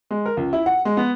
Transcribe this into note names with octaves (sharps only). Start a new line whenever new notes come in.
G#3
A#4
C#2
E4
F#5
G#3
B3